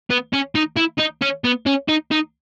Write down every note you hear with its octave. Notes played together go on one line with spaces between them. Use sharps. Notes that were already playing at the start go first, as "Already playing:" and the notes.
B3
C#4
D#4
E4
D#4
C#4
B3
C#4
D#4
D#4